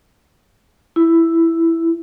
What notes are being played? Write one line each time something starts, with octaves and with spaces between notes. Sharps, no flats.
E4